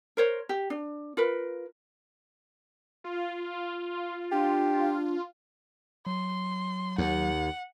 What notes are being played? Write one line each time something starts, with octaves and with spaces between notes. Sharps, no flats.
A#4 C5 C#5
G4
D4
F4 A#4 B4
F4
D4 G4
F#3 C6
D#2 F#5